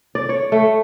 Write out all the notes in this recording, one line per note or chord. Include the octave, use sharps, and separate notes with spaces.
D5
C#5
A3